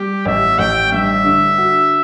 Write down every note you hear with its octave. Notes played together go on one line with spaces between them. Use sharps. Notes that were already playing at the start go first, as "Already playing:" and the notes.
Already playing: G3 G4
A1 E5
A1 G5
G2 E5
D3
F#4